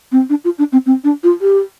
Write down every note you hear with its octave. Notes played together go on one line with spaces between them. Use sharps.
C4
D4
F4
D4
C4
C4
D4
F4
G4